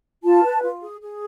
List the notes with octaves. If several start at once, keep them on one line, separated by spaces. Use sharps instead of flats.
F4 A5
B4
F4
G#4
G#4